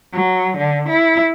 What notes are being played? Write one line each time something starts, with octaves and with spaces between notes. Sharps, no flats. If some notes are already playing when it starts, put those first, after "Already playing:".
F#3
D3
E4